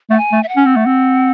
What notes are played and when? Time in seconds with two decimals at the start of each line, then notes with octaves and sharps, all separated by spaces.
0.10 A3 F#5
0.17 G#5
0.32 A3
0.43 E5
0.49 F#5
0.56 C#4
0.66 C4
0.76 A3
0.86 C4